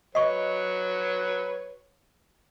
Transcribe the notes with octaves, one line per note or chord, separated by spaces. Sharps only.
F#3 B4 C#5 D#5 C#6